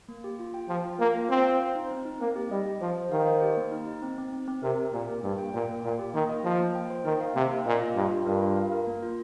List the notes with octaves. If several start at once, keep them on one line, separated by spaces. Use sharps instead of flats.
A#3
G4
F4
G5
F3 G5
F4
A#3 F5
F4
C4 F4
F5
C5
D#4
C4
D#4
A#3 C4
G4
G3 D#5
G4
F3 C5
C5
D#3 F5
C5
G4
A#3
D#4
D#4
C4
C4
C4
C4
C3 A#4
A#4
A#2 G4
G4
G2 A#3
G5
A#2 G5
A#3
A#2 A#3
G4
D#3 A#3
D#5
F3 F4
A#3
G5
C5
D#3 D#4
F5
C3 A#3
F5
A#2 D#5
F4
G2 F4
F4
G2 A#4
F4
F5
A#4
A#3
F4